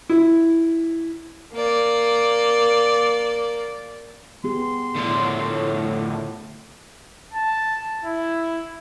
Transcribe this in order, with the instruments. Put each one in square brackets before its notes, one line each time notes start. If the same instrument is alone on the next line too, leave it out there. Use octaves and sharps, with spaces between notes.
[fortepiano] E4
[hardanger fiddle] A#3 D5
[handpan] B3 G4 G#4 [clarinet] C6
[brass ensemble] A2 [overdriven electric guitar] D3 F3
[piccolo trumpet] A5
E4